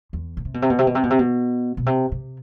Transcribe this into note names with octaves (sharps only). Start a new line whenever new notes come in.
E2
B2
C3
B2
C3
B2
C3
B2
C3
B2
C3
B2
B2
C3
C3